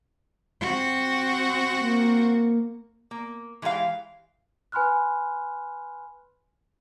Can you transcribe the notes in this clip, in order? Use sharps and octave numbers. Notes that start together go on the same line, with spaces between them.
C4 F#4
A#3
A#3
E3 G#3 G4 A4 F5
B4 G#5 B5 C6 F6 F#6